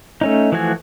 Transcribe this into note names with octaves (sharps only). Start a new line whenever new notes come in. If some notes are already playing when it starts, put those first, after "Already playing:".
A3 C#4 D#4
E3 F3 A3 F#4 G#5